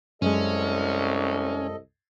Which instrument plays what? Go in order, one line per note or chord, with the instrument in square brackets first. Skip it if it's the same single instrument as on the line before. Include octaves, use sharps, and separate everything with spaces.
[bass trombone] C2 [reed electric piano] F#2 G#3 [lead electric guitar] C#4 [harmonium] A4 D#5